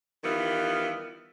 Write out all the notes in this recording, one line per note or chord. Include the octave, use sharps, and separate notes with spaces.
D#3 E3 G3 B3 F4